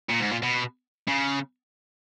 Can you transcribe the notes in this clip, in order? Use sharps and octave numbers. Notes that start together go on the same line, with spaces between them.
A#2
G#2
A#2
B2
C#3